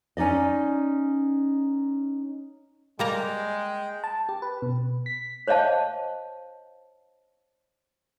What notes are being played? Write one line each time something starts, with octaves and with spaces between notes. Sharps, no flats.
C#4 D#4 D5 D#5
G3 G#3 A#3 G5 A#5
A5
G4
B4
B2
B6
C5 C#5 D#5 F5 A5